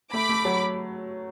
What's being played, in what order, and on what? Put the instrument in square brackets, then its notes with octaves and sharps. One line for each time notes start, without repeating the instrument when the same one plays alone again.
[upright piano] A3 [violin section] B5 D6
[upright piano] A3
F#3